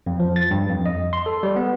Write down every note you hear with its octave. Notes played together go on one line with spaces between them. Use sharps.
F2
F3
A6
G2
F2
D#5
C6
A4
G3
B3